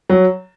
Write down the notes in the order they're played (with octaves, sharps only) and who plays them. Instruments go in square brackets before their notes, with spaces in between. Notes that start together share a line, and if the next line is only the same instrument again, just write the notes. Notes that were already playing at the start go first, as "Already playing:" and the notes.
[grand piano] F#3